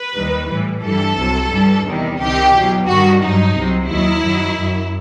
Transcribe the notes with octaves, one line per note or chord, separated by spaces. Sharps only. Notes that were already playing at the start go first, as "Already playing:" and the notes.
Already playing: B4
D#2 D#3 G3
A2 E3 G3
G2 E3 G3 A4
C2 C3 F#3
G2 E3 G3
E2 C3 D#3 G3
C2 C3 D#3 G4
E2 B2 F#3
G2 D#3 G3 F#4
G2 F#3 D#4
C2 C3 F#3
D#2 D#3 F#3 E4
F#2 D#3 F#3
F#2 F#3